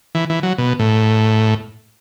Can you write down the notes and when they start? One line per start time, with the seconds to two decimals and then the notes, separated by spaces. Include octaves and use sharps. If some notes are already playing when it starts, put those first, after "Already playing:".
0.15 E3
0.30 E3
0.43 F#3
0.58 B2
0.79 A2